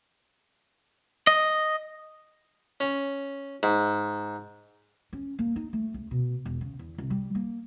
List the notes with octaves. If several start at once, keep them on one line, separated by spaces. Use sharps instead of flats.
D#5
C#4
G#2
C#4
A#3
D#4
A3
C#2
B2
E1
C#3
E2
C2
G3
A#3